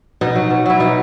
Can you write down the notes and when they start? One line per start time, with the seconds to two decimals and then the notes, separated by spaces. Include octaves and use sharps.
0.21 B2 D#4
0.35 F#3
0.51 B2
0.66 F#3 E4
0.80 B2 D#4